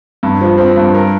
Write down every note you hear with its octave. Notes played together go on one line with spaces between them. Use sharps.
G2
F3
C4
G2
A#4